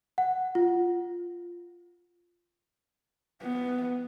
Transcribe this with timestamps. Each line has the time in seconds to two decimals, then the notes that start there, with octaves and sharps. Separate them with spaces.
0.18 F#5
0.55 F4
3.42 B3